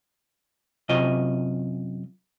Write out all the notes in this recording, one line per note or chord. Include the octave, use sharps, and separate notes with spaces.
F#2 C3 F4 D#5